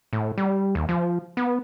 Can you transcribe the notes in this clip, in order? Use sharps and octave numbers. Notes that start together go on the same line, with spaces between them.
A2
G3
D#2
F3
B3